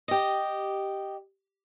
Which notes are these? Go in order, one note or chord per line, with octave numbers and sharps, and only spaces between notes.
G4 D#5